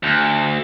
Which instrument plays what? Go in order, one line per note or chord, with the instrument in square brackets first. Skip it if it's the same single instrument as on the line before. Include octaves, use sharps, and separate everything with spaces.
[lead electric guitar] D2